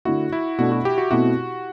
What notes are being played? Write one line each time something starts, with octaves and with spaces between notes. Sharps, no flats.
D3 A3 E4 F#4
E4
B2 A3 D4 F#4
F#4
G4
F#4
B2 A3 C4 E4 F#4